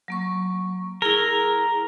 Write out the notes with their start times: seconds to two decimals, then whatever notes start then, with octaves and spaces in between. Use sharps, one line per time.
0.08 F#3 A#3 C#6
1.02 E4 G#4 A#4